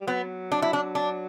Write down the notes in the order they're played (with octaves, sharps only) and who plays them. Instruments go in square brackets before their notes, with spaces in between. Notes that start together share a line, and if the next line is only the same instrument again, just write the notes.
[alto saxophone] G3
[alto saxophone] F#3 [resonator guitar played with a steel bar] B3
[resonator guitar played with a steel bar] D4
E4
D4
D4